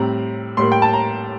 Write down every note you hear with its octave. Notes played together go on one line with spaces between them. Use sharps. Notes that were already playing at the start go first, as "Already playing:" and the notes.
Already playing: A2 G3 C4 A#5
A2 G3 A#3 C6
G5
A5
A#5